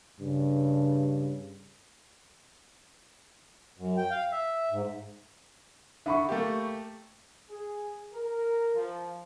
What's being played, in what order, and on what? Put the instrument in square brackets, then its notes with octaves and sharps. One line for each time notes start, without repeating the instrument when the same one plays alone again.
[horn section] G2 C#3
[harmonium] F#2
G5
F5
E5
G#2
[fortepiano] D3 [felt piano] E5 B5 C#6
[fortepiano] A3 A#3 G4
[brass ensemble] G#4
A#4
F3